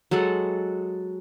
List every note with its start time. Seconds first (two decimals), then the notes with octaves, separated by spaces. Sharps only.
0.11 F#3 G#3 A4 F#5